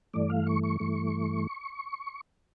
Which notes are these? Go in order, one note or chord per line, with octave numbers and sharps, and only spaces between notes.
G2 E3 A3 D5
F5
C#6
C#6
G2 E3 A3